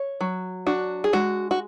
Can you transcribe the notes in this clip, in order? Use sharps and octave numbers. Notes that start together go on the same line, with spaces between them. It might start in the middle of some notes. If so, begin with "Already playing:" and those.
Already playing: C#5
F#3
D4 F#4
G#4
G#3 F#4
F#4